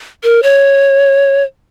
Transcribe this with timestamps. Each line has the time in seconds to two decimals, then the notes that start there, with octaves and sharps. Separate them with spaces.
0.24 A#4
0.43 C#5